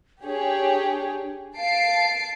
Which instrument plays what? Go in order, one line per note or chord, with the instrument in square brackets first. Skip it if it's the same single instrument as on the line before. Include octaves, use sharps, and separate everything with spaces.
[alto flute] D4 [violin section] G4 G#4 C#5
[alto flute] F5 [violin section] A5 C7 D7